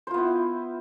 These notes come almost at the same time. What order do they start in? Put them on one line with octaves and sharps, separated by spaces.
C5 F4 B3 E4